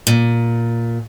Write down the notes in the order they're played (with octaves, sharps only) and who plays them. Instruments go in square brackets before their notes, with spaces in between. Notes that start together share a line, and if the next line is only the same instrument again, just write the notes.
[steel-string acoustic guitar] A#2